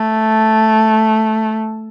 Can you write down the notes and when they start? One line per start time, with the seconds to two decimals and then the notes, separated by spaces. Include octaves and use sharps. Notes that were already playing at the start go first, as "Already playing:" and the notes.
Already playing: A3